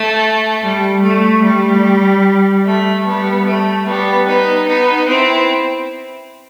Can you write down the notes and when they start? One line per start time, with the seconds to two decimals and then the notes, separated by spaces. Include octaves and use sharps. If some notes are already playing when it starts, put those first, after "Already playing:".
Already playing: A3
0.64 G3
1.04 A3
1.44 G3
2.66 A3
3.06 G3 B3
3.46 A3
3.87 G3 B3
4.27 B3 D#4
4.67 B3 D#4
5.07 C4 E4